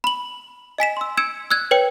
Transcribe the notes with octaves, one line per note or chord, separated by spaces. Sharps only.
B5 F#7
D#5 G#5 B6 E7
C6 E6
E6 G#6 C#7 D7 E7
E6 F#6 G#6
B4 C#5 G5 C#7